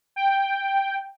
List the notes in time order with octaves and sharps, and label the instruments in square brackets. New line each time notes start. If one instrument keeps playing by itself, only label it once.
[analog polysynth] G5